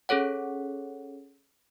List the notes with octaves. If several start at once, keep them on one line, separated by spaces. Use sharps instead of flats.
C#4 G#4 A4 C#5 F#5